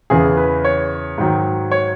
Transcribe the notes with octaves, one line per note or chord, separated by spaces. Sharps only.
E2 C#3 E3 G#4
B4
C#5
G#2 D#3 F#3
C#5